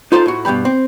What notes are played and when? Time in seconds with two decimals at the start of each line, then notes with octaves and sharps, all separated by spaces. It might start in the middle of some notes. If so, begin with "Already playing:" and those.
0.12 D#4 F4 A4 C5 F5 C6
0.26 A2 F#4
0.45 G2 B2 F#3 G5 B5
0.65 C4